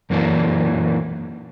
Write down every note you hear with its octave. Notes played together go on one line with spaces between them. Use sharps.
F#2 A#2 E3 F#3 A#3 D4